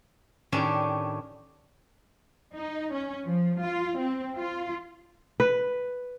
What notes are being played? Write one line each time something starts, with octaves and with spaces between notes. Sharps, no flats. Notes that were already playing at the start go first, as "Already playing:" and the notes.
A2 D#3 C#4 D4 G4
D#4
C#4
F3
F4
C4
F4
B4